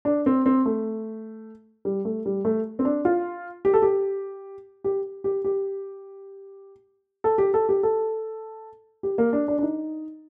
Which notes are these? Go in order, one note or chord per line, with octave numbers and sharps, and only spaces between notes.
D4
C4
C4
A3
G3
A3
G3
A3
C4
D4
F4
G4
A4
G4
G4
G4
G4
A4
G4
A4
G4
A4
G4
A#3
D4
D4
D4
D#4